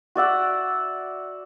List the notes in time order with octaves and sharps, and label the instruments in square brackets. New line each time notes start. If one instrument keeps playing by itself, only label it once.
[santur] F#4 D5 E5 F#5